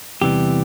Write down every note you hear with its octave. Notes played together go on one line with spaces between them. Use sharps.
E2 C3 E3 G3 G4